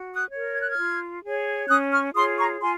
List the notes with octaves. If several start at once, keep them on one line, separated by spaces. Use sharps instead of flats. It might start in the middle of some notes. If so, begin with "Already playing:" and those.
Already playing: F#4
D#6 F#6
C#5
A#4
G#6
F#6
F6 G#6
F4
G#4 C#5
C#4 D#6 F#6
C#6 F6
F4 G#4 C#5 C6 D#6
A#5 C#6
F4 G#5 C6